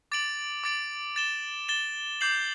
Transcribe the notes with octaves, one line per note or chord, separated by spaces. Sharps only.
D6 A6 D7 F#7
D6 A6 D7 F#7
A6 E7 G7
A6 E7 G7
D6 G6 C7 F#7